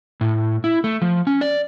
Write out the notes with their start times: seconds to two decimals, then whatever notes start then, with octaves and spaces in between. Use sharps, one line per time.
0.21 A2
0.64 E4
0.84 A3
1.02 F3
1.27 C#4
1.41 D5